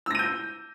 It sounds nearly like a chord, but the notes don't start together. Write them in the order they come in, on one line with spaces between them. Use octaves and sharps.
E6 A#6 D#7 G6